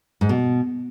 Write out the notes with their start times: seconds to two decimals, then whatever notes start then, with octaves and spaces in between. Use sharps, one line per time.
0.21 G#2
0.29 B2